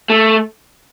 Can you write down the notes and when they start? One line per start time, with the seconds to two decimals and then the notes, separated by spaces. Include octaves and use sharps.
0.10 A3